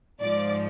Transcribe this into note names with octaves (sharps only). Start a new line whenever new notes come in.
G#2 F3 D5